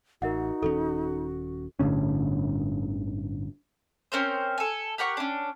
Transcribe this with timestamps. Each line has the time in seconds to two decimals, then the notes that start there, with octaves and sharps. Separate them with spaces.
0.22 A1 D#4 F#4 A#4 E5 F#5
0.62 D#1 D#3 C#4 A4
1.79 G1 A2 D3 C#4
4.12 C4 C#4 A#4 C5
4.58 A4 G#5
4.98 G4 A#4 F#5 C#6
5.17 C#4 D4